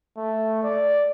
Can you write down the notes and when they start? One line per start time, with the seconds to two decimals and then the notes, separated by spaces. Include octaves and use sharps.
0.17 A3
0.63 D5